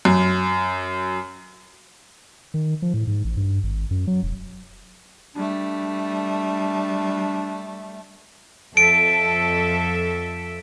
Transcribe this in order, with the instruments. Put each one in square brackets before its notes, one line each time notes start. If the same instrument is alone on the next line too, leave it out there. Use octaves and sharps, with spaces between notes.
[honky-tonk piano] F#2
[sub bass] D#3
F3
A2
G#2
A1
G2
G#1
F#2
F#3
E1
[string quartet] G3 A3 [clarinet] D4
[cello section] F2 A4 E5 [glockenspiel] D7